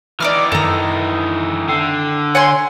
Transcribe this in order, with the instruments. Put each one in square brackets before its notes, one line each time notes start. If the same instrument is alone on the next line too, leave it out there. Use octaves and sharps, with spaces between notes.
[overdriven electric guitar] E3 D#4 [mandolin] D5 D6 F6
[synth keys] F#2 D#3 [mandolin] A4 A#5
[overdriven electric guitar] D3 [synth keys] G5 C7
[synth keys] C#5 [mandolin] F#5 G#5 C6